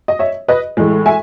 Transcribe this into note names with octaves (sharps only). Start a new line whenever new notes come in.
D#5
C#5 E5
B4 D#5
A2 E3 G#3
E5 G#5